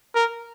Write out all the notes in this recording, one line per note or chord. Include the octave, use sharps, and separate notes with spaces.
A#4